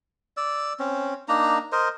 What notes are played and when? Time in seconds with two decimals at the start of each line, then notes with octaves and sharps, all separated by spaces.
0.37 D5 E6
0.79 C4 C#4
1.28 A#3 D4 D#4 A#5
1.72 A#4 C5 D#5